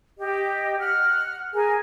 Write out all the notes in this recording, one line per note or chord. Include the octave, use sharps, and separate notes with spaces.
G4 D#5
F#5 F6
G#4 A#4 G#5